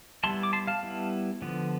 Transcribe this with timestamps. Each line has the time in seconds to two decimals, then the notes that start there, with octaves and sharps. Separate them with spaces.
0.24 G3 B3 E4 A5 C6
0.43 D6
0.53 A5 C6
0.67 F5 A5
0.83 G3 B3 E4
1.42 D3 F3 B3